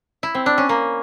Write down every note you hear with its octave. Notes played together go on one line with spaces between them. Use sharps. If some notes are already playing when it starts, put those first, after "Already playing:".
E4
C4
D4
C#4
A#3